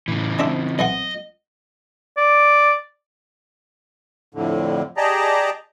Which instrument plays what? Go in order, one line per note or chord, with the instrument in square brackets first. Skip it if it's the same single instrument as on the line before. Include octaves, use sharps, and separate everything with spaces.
[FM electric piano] A2 [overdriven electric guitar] C#3 E3
[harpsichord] G#3 D4 E5 [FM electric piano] C4
[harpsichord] B1 E3 F#5 [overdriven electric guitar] D#5
[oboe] D5
[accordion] F2 A2 D3
G4 G#4 D5 D#5 A5 A#5